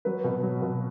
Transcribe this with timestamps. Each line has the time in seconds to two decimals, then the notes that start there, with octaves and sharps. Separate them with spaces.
0.05 F#3 B4
0.24 B2
0.43 F#3
0.62 B2